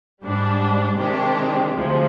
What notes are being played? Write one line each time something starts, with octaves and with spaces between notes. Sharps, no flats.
G#2 G3 D4
C3 D#3 G#3 D4 G4
D2 C3 F3 G#3